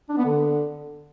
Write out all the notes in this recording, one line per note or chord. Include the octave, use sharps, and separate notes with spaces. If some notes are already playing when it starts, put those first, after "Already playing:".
D4
B3
D3